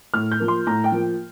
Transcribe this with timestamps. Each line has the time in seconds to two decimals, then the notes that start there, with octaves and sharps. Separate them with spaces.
0.14 A2 F6
0.32 G6
0.40 F3 A#3
0.48 C6
0.67 A2 A#5
0.84 G5
0.92 F3 A#3